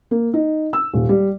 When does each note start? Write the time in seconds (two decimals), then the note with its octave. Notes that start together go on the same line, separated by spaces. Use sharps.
0.11 A#3
0.34 D#4
0.73 E6
0.93 D#1
1.09 G3